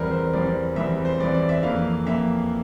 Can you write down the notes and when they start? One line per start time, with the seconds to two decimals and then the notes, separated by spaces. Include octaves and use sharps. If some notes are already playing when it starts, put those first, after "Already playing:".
Already playing: E2 E3 G3 C4 A#4
0.11 C5
0.33 E2 E3 G3 C4 D5
0.76 E2 E3 G3 C4 E5
1.05 C5
1.19 E2 E3 G3 C4 D5
1.34 D5
1.49 E5
1.63 F2 E3 A#3 F5
2.06 F2 E3 A#3 E5